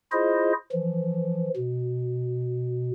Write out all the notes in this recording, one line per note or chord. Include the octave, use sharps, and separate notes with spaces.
E4 F4 G#4 C5 D#5
E3 F3
B2